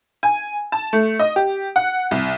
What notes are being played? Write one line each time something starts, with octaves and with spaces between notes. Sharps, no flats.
G#5
A5
A3
D#5
G4
F#5
C2